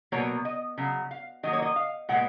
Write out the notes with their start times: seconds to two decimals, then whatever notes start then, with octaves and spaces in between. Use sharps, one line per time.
0.12 B2 F#3 A#3 C#5
0.45 D#5
0.78 C#3 F#3
1.11 F5
1.43 D#3 F#3 A#3 D#5
1.53 C#5
1.62 D#5
1.76 F5
2.09 A#2 G#3 B3 F#5